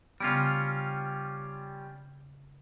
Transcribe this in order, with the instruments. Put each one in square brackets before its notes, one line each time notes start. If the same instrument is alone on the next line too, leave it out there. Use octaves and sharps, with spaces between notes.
[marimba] C#3 B3 [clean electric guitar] G3 C#4 F4